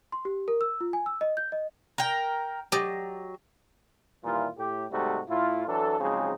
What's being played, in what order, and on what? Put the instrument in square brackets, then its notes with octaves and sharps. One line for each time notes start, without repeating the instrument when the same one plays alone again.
[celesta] C6
G4
A#4
E6
F4
G#5
E6
D#5
G6
D#5
[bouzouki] A#4 G5
[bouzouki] F#3 [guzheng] G4 D5 D#5
[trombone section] D#2 A#2 E3 G3 E4 F4
A2 G4
G#2 C3 G3 A3 D#4 F#4
A2 E4 F4
E3 F#3 D4 A4
C#3 F3 F#3 G#3 C4 D#4